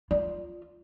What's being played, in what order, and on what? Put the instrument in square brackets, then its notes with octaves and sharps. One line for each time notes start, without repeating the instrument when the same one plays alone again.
[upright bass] F4 [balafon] D5